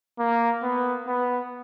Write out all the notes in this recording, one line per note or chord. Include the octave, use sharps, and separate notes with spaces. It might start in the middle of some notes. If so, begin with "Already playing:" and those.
A#3
B3
B3